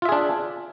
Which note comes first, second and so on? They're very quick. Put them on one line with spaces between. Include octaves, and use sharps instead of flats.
F4 E5 G#4 D4